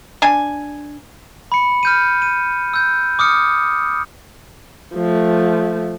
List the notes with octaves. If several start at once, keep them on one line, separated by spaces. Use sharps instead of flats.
D4 G#5
B5 C#7
F6 G6 D#7
D#7
E6 G6
D6 D#6 F6 C#7
F3 A3